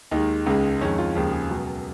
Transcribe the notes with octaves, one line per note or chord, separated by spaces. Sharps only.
D#2 D#3 G#3 D#4
C#2 C#3 G#3
F2 D#3 G#3 C#4
F4
D#2 C#3 F3 G#3
G#4
C#2 B2 F#3